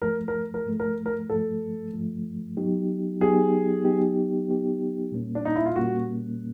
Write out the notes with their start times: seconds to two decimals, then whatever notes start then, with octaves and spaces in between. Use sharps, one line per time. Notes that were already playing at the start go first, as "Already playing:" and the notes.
0.02 G#2 F3 A3 A#4
0.28 A#4
0.54 A#4
0.66 G#2 F3 A3
0.80 A#4
1.06 A#4
1.29 G#2 F3 A3 A4
1.93 G#2 F3 A3
2.57 F#3 B3 D#4 G4
3.21 F#3 B3 D#4 G4 G#4
3.84 F#3 B3 D#4 G4
4.49 F#3 B3 D#4 G4
5.12 A#2 G3 A#3 C#4
5.35 D4
5.45 D#4
5.56 E4
5.66 F4
5.76 A#2 G3 A#3 C#4 F#4